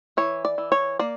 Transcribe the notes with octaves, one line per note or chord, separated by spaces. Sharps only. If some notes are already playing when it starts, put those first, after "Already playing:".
E3 C#5
D5
E3
C#5
A#3 D5